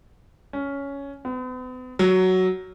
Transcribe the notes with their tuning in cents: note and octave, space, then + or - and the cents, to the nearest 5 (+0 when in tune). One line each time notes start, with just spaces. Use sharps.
C#4 +10
B3 +45
F#3 +5